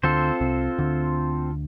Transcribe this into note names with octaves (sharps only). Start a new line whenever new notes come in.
D2 D3 C4 F4 A4 C5
C2 C3
D2 D3